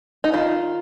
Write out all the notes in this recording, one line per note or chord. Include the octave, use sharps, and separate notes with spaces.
D#4
D#3 F4